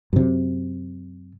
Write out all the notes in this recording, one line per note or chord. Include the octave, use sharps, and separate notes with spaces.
F#2 C3